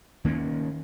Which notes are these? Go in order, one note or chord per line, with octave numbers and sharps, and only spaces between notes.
D#3 A#3 C#4